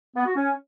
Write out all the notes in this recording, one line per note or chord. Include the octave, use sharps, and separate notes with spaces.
B3
F#4
C#4